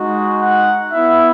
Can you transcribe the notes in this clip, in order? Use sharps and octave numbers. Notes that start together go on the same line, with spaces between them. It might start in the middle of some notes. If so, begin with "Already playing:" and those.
Already playing: G#3 D#4 F#4
F#5
B3 E4 E5